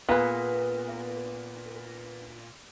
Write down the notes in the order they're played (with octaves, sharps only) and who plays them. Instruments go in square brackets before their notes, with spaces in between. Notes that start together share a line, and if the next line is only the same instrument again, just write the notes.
[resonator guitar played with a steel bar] A#2 [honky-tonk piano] B3 [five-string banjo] G#4 B4